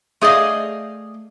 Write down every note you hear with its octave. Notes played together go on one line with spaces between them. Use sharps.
A3 G#4 D5 D#5 F5